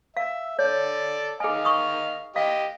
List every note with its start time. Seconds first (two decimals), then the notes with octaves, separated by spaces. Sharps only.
0.17 E5 F5
0.59 A4 C#5 D5
1.40 D#3 G#4 D#5 F5 G#5
1.65 C#6 D#6
2.36 G4 D#5 F5